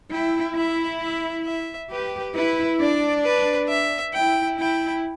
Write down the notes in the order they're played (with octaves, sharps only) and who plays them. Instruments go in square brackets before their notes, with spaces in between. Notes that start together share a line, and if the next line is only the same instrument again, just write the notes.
[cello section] E4 [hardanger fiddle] G5
[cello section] E4 [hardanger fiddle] E5
[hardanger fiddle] E5
E5
[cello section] G4 [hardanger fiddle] B4
[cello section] E4 [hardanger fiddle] B4
[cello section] D4 [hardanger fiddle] D5
[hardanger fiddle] B4
E5
[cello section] E4 [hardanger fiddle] G5
[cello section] E4 [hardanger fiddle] G5